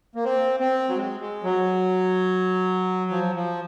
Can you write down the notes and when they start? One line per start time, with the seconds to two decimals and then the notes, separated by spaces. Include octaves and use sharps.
0.15 A#3
0.24 C4
0.60 C4
0.89 F#3
0.96 G#3
1.20 G#3
1.44 F#3
3.11 F3
3.35 F3